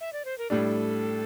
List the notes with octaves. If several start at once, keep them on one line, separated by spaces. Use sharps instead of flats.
E5
D5
C5
A#4
A2 G3 D4 A4